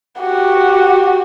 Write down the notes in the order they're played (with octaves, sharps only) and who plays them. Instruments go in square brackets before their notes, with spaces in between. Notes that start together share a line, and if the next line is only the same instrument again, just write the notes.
[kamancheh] F#4 G4